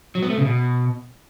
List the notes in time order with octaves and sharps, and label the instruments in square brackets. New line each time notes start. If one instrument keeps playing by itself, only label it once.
[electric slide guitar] F#3
B3
A3
C#3
B2